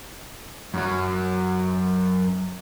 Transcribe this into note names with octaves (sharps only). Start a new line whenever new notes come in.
F#2 F#3